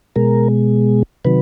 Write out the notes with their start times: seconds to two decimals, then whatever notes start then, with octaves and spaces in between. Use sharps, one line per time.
0.16 B2 G#3 A#4
1.25 C3 D#3 F#3 B4